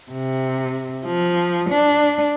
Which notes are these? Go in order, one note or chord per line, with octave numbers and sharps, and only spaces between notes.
C3
F3
D4